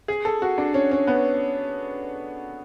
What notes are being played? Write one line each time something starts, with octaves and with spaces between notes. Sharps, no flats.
G#4
A4
F#4
D4
C#4
C#4
B3